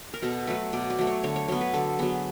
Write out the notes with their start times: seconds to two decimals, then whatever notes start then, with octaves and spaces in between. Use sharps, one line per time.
0.14 A#4
0.22 B2 A4
0.47 F#3 A3 B4
0.73 B2 D5
0.90 D5
0.98 F#3 A3
1.07 C#5
1.23 D3 C#5
1.36 C#5
1.48 F#3 B3 C#5
1.61 B4
1.74 D3 A4
1.99 F#3 B3 G#4